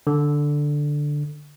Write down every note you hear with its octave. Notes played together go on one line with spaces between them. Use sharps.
D3